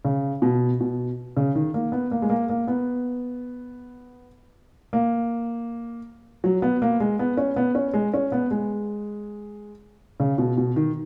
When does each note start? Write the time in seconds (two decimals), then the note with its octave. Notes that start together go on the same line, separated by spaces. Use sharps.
0.05 C#3
0.42 B2
0.80 B2
1.37 C#3
1.55 D#3
1.74 A#3
1.92 B3
2.11 A#3
2.22 G#3
2.30 A#3
2.49 A#3
2.67 B3
4.93 A#3
6.44 F#3
6.62 B3
6.82 A#3
7.00 G#3
7.19 B3
7.37 C#4
7.56 B3
7.75 C#4
7.94 G#3
8.14 C#4
8.32 B3
8.51 G#3
10.20 C#3
10.38 B2
10.58 B2
10.76 D#3